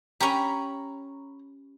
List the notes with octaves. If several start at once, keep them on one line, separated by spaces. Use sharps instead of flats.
C#4 G4 A#5 B5 C#6